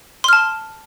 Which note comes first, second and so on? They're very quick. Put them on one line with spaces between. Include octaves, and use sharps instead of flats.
C6 F6 A5